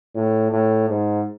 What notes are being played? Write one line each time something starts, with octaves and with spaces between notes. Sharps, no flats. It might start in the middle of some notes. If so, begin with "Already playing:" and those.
A2
A2
G#2